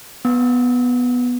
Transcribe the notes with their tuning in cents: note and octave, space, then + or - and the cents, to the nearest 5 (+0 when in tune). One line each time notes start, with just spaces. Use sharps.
B3 +0 E6 -35